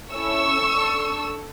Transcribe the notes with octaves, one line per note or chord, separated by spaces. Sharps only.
C#4 E4 A4 C#6 E6
D4 A4